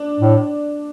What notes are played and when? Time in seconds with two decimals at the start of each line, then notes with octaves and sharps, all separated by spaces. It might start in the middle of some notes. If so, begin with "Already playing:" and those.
Already playing: D4
0.20 A2